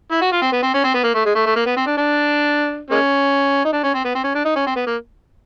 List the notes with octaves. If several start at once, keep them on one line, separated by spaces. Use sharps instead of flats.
E4
F#4
F4
C4
B3
C4
C#4
C4
B3
A#3
A3
G#3
A3
A3
A#3
B3
C4
D4
D4
G#3 A#3 C#4
D#4
D4
C#4
C4
B3
C4
C#4
D4
D#4
C#4
C4
B3
A#3